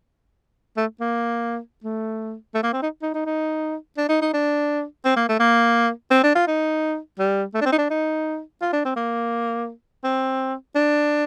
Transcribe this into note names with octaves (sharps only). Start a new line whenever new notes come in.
A3
A#3
A3
A3
A#3
C4
D#4
D#4
D#4
D#4
D4
D#4
D#4
D4
C4
A#3
A3
A#3
C4
D4
F4
D#4
G3
A3
D4
C4
D#4
D4
D#4
F4
D4
C4
A#3
C4
D4